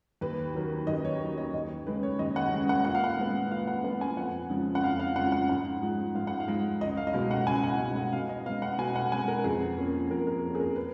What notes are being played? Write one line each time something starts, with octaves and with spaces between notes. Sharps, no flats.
D#2 B4
D#3 F#3
D#2 D#5
C#5
D#3 F#3
D#5
D#2 D#5
C#3 G#3 C#4 B4
C#5
D#2 D#5
F#5
C#3 G#3 C#4
F#5
A#2 F#5
F5
F#5
G#3 B3
A#2 F5
F#5
G#3 B3 F#5
G#5
F2 F#5
C#3 F3 G#3
F#5
F2 F5
F5
C#3 F3 G#3 F#5
F#5
G#2 F#5
F3 G#3
G#2 F5
F#5
F5
F3 G#3
C#2 D#5
F5
D#5
B2 G#3 F5
F#5
C#2 G#5
F#5
B2 G#3 F#5
F#5
B2 F5
D#5
G#3 B3 F5
F#5
B2 G#5
F#5
G#3 B3 G#5
A#4
F2 G#4
F3 A#3 C#4
F2 A#4
A#4
F3 A#3 C#4
G#4
A#4
B4